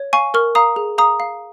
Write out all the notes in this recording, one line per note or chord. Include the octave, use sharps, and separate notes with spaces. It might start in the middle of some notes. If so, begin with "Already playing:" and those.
Already playing: C#5
F5 G#5 C#6
A#4 C#6 F6
F5 A#5 D#6
G#4
F5 A#5 D#6
F5